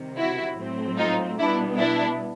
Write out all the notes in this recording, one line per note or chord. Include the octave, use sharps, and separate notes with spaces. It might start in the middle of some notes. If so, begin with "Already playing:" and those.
Already playing: C3 D#3 G3
E4 F#4
A2 F#3 A3 C4
D#4 F4
B2 G3 B3 D4 E4
D4 E4